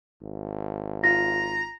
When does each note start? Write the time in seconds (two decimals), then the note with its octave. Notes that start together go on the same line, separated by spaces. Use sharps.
0.22 G#1
1.04 F4 A#5 A#6